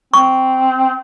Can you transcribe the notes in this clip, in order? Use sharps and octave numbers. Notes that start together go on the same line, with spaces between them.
C4 C#6